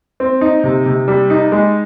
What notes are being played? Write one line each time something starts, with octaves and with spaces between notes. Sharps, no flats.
C4
D#4
C3
C3
G3
D#4
G#3